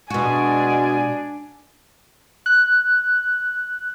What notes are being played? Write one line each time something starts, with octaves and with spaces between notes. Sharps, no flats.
B2 G#3 D4 F#4 D5 G#5
F#6